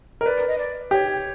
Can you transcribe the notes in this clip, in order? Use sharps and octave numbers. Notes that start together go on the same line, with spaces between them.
A#4
B4 D5
D#5
D5
G4 C#5